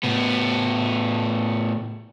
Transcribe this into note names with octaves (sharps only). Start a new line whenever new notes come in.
A2 B3